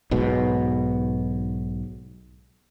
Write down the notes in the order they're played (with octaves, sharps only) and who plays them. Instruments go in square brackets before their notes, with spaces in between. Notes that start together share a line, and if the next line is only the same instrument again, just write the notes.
[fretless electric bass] B1 G#2 B2